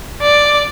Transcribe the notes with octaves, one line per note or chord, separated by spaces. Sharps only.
D5